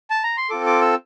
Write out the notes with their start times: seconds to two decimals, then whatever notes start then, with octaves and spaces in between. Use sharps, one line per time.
0.10 A5
0.23 A#5
0.37 C6
0.50 C4 F4 A4 D6
0.66 D6
0.81 E6